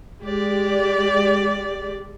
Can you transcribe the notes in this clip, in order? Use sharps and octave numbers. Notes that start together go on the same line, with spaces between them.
G#3 G4 D5